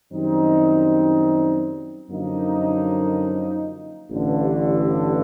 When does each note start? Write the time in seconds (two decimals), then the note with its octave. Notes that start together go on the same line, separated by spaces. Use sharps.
0.11 F#2 D#3 G3 C4 D#4
2.10 F#2 D3 F3 A#3 D#4
4.09 A1 G2 D3